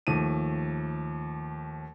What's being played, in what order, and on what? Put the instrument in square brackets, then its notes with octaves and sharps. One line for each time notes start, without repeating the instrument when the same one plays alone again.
[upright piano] D#2 F3 A3 A5 D#7